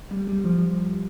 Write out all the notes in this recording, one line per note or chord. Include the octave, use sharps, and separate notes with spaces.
G3
G3
F3